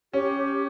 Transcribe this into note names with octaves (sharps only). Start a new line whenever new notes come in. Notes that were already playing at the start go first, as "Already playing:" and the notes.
C#4 G4